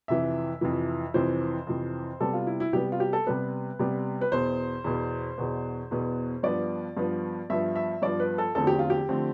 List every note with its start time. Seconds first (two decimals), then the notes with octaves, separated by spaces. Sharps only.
0.08 F2 C3 E3 E5
0.61 F2 C3 E3
1.14 F2 C3 E3 C5
1.67 F2 C3 E3
2.20 C3 G3 B3 A4
2.33 F4
2.47 E4
2.60 E4
2.73 C3 G3 B3 G4
2.92 F4
3.00 G4
3.13 A4
3.27 C3 G3 B3 B4
3.79 C3 G3 B3
4.21 B4
4.32 E2 B2 B3 C5
4.84 E2 B2 B3
5.38 E2 B2 B3
5.91 E2 B2 B3
6.43 G2 F3 B3 D5
6.97 G2 F3 B3
7.50 G2 F3 B3 E5
7.76 E5
8.02 G2 F3 B3 D5
8.20 B4
8.38 A4
8.55 E2 D3 F3 A3 C4 A4
8.67 G4
8.79 F4
8.90 G4
9.09 D3 F3 A3 C4